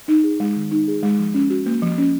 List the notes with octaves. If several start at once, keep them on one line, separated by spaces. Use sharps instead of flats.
D#4
G#4
G#3
D#3
D#4
G#4
G#3
F3
C#4
F#4
A#3
F3
C#4